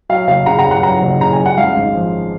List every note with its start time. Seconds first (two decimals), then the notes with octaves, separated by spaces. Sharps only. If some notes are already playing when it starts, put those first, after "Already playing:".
0.09 F#3 F5
0.28 F#1 F5
0.46 C#3 F#5 A#5
0.59 F#5 A#5
0.65 F#2
0.71 F#5 A#5
0.83 F#3 F#5 A#5
1.02 F#1
1.21 C#3 A#5
1.33 G#5
1.39 F#2
1.46 F#5
1.57 G#3 F5
1.76 G#1
1.95 F3